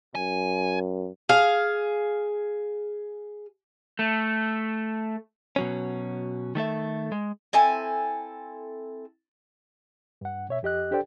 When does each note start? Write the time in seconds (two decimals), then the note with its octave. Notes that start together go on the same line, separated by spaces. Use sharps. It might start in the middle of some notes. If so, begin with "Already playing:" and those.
0.15 F#2 G#5
1.29 G#4 F5
3.99 A3
5.56 B2 F#3 C#4
6.55 D#3 A3 A4 E5
7.12 G#3
7.53 C4 E4 A4 G#5
10.21 G2 F#5
10.49 B2 C#5 E5
10.63 F2 G4 D#5 F#6
10.91 D4 G4 A4 C5 D5 G5